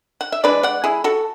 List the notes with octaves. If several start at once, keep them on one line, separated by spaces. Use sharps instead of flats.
F#5
E5
E3 G#3 D4 B4 D5
D5 F#5
E4 G#4
F#4 A4